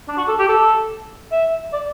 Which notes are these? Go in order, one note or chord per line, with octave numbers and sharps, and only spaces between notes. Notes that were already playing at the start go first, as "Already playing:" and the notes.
D4
F#4
A4
G4
A4
E5
D5